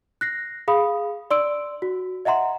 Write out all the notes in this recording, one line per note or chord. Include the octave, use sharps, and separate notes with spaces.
F#6 A#6 C7
G#4 F5 B5 D#6
D5 C6 E6 D7
F#4
D#5 E5 F#5 A#5 C6